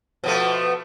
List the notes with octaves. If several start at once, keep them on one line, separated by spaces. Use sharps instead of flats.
B2 F3 A3